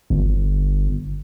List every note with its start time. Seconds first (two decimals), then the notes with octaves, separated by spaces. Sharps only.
0.10 G1